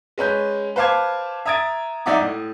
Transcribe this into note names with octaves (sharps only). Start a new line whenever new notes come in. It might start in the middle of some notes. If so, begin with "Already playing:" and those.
G#3 C#4 B4 G6
B4 C5 F5 A5 D6 G#6
E5 A#5 D#6 G#6 A6 D7
F#2 D#4 D5 E5 F#5 D6
A2